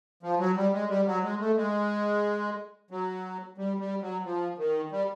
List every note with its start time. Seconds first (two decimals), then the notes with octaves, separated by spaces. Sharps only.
0.23 F3
0.40 F#3
0.56 G3
0.73 G#3
0.90 G3
1.07 F#3
1.23 G#3
1.40 A3
1.56 G#3
2.91 F#3
3.58 G3
3.80 G3
4.02 F#3
4.25 F3
4.58 D#3
4.92 G3